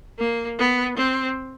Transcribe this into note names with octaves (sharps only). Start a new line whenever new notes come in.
A#3
B3
C4